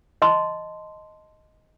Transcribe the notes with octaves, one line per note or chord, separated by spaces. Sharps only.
D#5 A5 C6